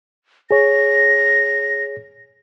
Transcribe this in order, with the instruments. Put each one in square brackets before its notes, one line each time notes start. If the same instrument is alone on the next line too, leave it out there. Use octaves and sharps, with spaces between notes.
[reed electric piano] G#4 C#5 [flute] A#6